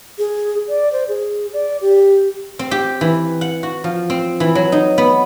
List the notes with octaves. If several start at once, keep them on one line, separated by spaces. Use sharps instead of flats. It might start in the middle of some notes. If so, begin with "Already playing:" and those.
G#4
D5
C5
G#4
D5
G4
C4
G4
E3
F#5
F#4
F3
C4
E3
F#3
D#4
B3